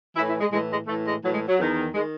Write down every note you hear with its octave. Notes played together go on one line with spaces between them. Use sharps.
A2 E3 E4
E4
G#3
A2 E3 G#3
G#3
A2 E3 A3
G#3
A2 E3 F#3
G#3
F#3
E2 D#3
D#3 G#3